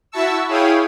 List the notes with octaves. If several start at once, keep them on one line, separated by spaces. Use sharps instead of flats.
E4 F#4 E5 A5 C#6 E6
E4 G#4 C#5 F5 G5 D#6